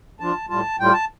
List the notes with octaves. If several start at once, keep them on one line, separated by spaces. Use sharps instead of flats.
F3 D4 F4 A5
A2 G3 F4 A5
A2 G3 F4 G5
A5